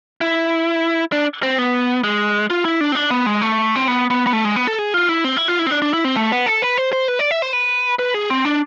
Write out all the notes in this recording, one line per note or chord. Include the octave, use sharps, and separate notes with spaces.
E4
D4
C4
B3
G#3
F4
E4
D4
C4
D4
B3
G#3
A3
C4
B3
B3
B3
A3
G#3
B3
A4
G#4
F4
E4
C4
E4
F4
E4
C4
D4
D4
E4
C4
A3
B3
A4
B4
C5
C5
B4
D5
E5
C5
B4
B4
G#4
C4
D4